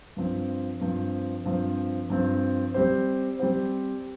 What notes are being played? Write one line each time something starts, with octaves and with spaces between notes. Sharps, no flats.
G2 F3 C4
G2 F3 C4
G2 F3 C4
G2 F3 C4
G3 C4 G4 C5
G3 C4 G4 C5